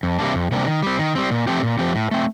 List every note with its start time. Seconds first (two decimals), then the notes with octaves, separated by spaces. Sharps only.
0.03 F2
0.19 C3 G3 A#3 D4
0.35 F2
0.51 C3 G3 A#3 D4
0.67 D#3
0.82 G3 C4
0.99 D#3
1.15 G3 C4
1.31 A#2
1.47 F3 A3 C4 G4
1.63 A#2
1.79 F3 A3 C4 G4
1.95 A2
2.11 A3 C4